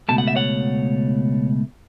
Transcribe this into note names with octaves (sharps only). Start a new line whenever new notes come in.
C#2 B2 A3 A5
F#5
E5
C#5 F#5